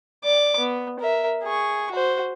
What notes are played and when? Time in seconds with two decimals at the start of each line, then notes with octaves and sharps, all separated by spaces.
0.24 D5 D6
0.59 B3
1.00 A#4 E5
1.43 G#4 C#6
1.91 F#4 C5